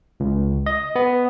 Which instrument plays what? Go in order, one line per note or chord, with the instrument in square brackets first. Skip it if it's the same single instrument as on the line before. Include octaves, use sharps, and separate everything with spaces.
[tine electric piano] C#2
D#5
B3